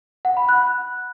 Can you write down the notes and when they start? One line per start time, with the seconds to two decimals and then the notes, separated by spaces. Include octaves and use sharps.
0.25 F#5
0.37 B5
0.49 F#6